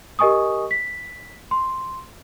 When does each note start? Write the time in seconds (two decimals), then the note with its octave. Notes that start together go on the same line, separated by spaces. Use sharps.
0.19 G4 A#4 D#5 G#5 C#6 D#6
0.71 B6
1.51 C6